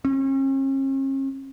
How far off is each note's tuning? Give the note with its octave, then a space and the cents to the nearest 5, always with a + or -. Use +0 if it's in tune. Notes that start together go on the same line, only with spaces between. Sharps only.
C#4 -45